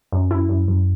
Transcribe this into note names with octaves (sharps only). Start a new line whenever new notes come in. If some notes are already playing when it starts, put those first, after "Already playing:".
F#2
F#2 E4
F#2
F#2